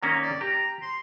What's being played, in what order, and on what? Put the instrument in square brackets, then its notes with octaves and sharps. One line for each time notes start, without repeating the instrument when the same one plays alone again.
[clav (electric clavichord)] D#3 A#3 C#4 [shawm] A#5
[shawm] D5
[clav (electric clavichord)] G4 [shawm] A#5
[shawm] C6